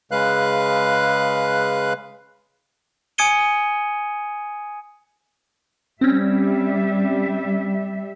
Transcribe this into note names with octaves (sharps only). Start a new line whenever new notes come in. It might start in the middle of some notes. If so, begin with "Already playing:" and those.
C#3 G#3 B4 F5 F#6
G#5 D#6 G#6 C#7 D#7 G7
G3 C4 C#4 E5